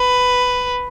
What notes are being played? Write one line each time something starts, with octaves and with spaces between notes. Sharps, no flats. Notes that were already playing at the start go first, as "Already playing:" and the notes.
Already playing: B4